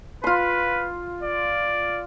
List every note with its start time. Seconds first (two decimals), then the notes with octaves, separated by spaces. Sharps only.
0.24 F4 B4 C6
1.23 D5